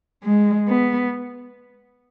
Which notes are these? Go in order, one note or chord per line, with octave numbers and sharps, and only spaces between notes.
G#3
B3